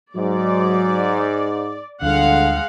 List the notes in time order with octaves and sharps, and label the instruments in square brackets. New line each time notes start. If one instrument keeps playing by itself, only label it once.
[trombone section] G#2 [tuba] F#3 [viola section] D5
[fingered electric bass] D2 G3 [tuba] D3 [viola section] G#3 F5 F#5